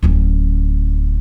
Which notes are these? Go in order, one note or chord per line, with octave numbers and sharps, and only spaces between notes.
D1 C#4